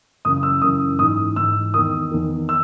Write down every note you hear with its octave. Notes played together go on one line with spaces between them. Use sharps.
F#2 C#3 E3 D#6
E6
F#2 C#3 E3 D#6
G#2 E3 D#6
G#2 E3 E6
E2 D#3 D#6
E2 D#3
E6